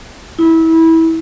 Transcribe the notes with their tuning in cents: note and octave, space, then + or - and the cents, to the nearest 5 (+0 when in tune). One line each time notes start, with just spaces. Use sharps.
E4 -25